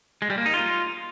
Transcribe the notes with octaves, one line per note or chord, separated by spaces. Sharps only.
G#3
G3
A#3
D#4
F4